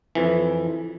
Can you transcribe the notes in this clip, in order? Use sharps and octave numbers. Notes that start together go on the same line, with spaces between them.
F2 E3